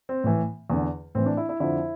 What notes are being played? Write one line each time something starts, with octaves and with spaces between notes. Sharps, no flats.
C4
A2 E3
E2 D3
A2 E3 C4
D4
E4
E4
F2 D3 E4